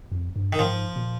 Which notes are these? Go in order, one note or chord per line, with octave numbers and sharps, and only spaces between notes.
F2
G2
D#3
G#2 F3
A#2